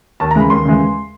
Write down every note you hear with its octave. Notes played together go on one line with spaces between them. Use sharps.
D#2 A5
A#5
C#3 E3 G#3 B5
D#2 C6
C#3 E3 G#3